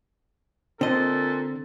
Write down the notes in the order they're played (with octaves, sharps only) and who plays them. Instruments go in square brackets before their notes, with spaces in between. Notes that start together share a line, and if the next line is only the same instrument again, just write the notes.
[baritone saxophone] A#2 [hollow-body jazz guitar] D3 D#5 [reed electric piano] C4 [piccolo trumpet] A4